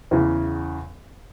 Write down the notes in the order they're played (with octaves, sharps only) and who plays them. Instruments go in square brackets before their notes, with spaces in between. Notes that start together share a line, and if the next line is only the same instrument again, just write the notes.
[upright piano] E2 C#3 E3